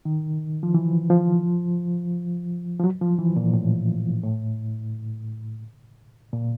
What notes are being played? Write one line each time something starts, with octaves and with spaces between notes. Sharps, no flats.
D#3
F3
E3
F3
F3
F#3
F3
E3
A#2
A2
A2
A#2